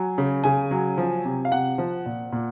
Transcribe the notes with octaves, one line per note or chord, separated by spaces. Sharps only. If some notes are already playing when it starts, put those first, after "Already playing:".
Already playing: F#3 G#5
C#3
C#3 G#5
F#3
F3
C3
F5
C3 F#5
F3
A#2
A#2